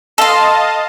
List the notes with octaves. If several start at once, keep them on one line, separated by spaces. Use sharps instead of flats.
A4 D#5 F5 A5 C6